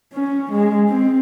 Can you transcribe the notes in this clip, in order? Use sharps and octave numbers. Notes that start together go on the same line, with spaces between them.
C#4
G#3
C4